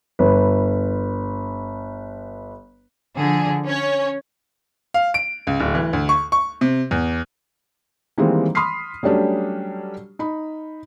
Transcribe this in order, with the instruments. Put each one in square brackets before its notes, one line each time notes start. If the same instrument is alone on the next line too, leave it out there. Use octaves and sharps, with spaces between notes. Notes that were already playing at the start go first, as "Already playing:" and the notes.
[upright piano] G1 B4
[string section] D3 F3 G#4
C#4 C#5
[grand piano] F5
D7
C#2
D1
E3
D2
C#6
C#6
C3
E2
[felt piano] D#3 E3 G3 G#3 A#3 C4
B5 C6 D#6 F6 B6 C7
F#3 G3 A3 C#4 D4 G4
D#4 B5